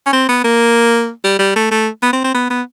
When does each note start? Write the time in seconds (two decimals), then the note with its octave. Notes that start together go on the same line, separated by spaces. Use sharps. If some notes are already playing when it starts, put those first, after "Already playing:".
0.06 C#4
0.13 C4
0.28 B3
0.44 A#3
1.24 G3
1.39 G3
1.56 A3
1.71 A3
2.02 B3
2.13 C4
2.24 C4
2.34 B3
2.50 B3